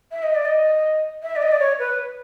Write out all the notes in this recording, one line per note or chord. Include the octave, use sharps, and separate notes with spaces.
E5
D#5
D5
D#5
E5
D5
D#5
D5
C#5
B4